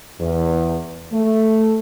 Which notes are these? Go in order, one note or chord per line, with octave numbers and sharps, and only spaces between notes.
E2
A3